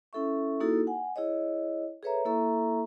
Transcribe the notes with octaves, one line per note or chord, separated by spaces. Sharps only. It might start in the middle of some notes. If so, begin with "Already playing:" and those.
C#4 E4 A4 E5 C#6
A#3 D#4 E4 F#4 G#4 A4
F#5 G#5
E4 G#4 C#5 D#5
G#4 A4 B4 C#5 E5 A#5
A#3 E4 A4 E5 A#5 C#6